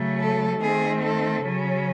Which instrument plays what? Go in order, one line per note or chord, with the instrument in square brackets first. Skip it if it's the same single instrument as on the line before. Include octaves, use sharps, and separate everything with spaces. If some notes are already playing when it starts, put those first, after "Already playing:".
Already playing: [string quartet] C#3 F#3 A3
A4
D#3 A3 C4 G#4
A4
C#3 F#3 C#4